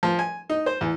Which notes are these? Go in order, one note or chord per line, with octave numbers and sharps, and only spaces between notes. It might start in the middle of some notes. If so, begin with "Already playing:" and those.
F3
G#5
D#4
C5
E2